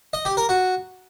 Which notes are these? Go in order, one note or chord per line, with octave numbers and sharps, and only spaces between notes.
D#5
G4
A#4
F#4